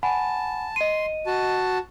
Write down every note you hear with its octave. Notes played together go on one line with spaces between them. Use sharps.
F#5 G#5 A5 B5
D#5 C6 D#7
F#4 A5